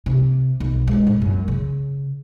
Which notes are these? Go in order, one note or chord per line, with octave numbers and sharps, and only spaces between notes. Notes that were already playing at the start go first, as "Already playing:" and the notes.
C3
B1
G#3
A2
F#2
C#3